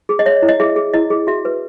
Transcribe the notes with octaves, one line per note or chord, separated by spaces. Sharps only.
G#4
D#5
C#5 E5
E4
D#5
G#4 E5
G#4
E4 D#5
G#4
F#4 E5
B4